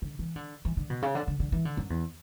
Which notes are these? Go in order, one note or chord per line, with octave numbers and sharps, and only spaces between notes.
D3
E3
D3
E3
D3
B2
C#3
D3
D3
D3
E3
D3
F#2
E2